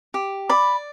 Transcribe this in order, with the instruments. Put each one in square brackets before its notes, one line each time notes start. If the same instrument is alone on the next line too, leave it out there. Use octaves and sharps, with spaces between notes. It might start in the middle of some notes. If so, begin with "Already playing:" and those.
[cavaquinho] G4
D5 B5